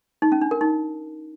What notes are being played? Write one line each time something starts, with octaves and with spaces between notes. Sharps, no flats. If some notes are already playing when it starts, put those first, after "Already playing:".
D#4
C#4
D4
A#4
D#4